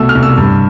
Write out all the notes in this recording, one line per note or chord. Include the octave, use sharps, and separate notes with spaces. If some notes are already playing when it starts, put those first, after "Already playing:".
Already playing: C2 B2 A3 E6
F6
C2
E6
G2